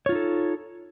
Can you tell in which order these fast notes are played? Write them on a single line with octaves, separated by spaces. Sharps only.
C#5 F4 D#4 A4